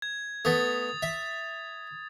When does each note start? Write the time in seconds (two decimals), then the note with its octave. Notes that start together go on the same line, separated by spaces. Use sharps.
0.02 G#6
0.45 A3 B3 D#6 A6
1.02 E5